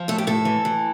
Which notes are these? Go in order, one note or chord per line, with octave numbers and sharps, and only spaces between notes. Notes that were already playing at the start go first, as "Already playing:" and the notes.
Already playing: F3
A2 A4
G4
A2 A4
E3
E3